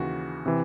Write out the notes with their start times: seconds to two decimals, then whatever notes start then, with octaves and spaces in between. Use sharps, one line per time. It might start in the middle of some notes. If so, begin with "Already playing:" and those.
Already playing: D#2 C#3 E3 F#4
0.46 C3 E3